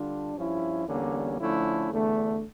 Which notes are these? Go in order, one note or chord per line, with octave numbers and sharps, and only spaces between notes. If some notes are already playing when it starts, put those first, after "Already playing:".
Already playing: D3 G3 D4 F4
G2 F3 C#4 E4
E2 D3 G3 A#3 C#4
D3 F3 A3 C#4 E4
E2 D3 A3 D4